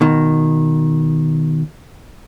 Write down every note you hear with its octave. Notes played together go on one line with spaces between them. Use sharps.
B2 D#3